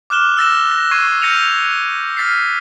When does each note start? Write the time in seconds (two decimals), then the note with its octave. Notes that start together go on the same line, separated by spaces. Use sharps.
0.10 D6 F6 F#6 E7 G7
0.37 E6 A6 A#6 E7
0.71 A#6
0.91 C#6 G#6 C7 D#7
1.22 F6 G6 A#6 C#7 D#7 F7
2.17 F6 A6 B6 C7